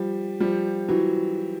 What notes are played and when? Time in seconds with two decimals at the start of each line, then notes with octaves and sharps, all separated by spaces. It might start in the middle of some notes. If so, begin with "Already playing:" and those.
Already playing: F3 G3
0.40 F3 G3
0.88 E3 F#3